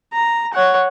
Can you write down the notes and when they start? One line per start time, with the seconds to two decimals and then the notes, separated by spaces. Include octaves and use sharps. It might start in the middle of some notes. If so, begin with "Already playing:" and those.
0.13 A#5
0.53 C#5 F#5